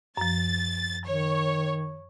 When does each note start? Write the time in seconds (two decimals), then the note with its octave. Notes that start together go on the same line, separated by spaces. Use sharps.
0.17 F#2 F3 A6
1.05 D#3 C#5